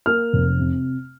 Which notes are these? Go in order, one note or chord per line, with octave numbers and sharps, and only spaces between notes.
A#3 F6
F1
C3